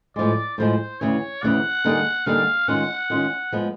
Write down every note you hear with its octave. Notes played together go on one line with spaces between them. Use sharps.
A2 F3 G#3 D5
A2 F3 G#3 C5
D2 C#3 E3 C#5
D2 C#3 E3 F#5
D3 G3 A#3 D#4 G#4
D3 G3 A#3 D#4 G#4 F5
D#3 G#3 C#4 F4 F#5
D#3 G#3 C#4 F4
F3 G#3 B3